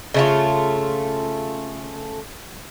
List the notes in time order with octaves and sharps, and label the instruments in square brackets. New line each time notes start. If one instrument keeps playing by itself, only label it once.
[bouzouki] C#3 A3 F4